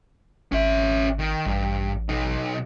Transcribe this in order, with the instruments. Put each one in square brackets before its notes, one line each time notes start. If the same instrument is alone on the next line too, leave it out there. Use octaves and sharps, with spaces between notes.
[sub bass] G#1 [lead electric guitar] C#4 E5
[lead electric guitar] D#3
[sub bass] A1 [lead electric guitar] G2
[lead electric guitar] B1 D#4